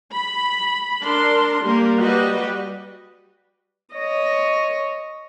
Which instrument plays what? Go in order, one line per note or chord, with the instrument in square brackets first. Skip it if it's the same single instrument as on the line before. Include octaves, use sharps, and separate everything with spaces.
[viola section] B5
D4 A#4 C6
G3 A#3 A#4
G3 F#4 G4 B4 D#5
[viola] C#5 D#5